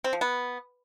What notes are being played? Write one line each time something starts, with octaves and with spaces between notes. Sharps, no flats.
C4
F3
B3